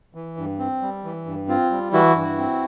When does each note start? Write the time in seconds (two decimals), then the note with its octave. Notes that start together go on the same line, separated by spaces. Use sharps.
0.15 E3
0.37 G2
0.59 C4
0.82 G3
1.04 E3
1.26 G2
1.48 C4 F4
1.71 G3
1.93 E3 E4 F#4
2.15 G2
2.38 C4